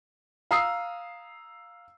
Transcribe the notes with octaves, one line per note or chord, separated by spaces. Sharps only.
F5 A#5 D#6 E6 C7